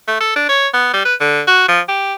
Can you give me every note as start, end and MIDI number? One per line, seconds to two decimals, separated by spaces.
0.08 0.16 57
0.20 0.32 69
0.36 0.44 62
0.49 0.68 73
0.73 0.89 59
0.93 1.02 55
1.05 1.14 71
1.20 1.42 50
1.47 1.65 66
1.68 1.80 53
1.88 2.14 67